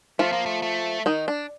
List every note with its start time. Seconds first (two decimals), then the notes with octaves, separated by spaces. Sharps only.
0.19 F3 A3 F4
0.33 A#3
0.46 A3
0.62 A3
1.06 D#3 D#4
1.28 D4